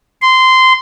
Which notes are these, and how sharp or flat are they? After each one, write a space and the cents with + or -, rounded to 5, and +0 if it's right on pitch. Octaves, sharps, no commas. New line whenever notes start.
C6 -15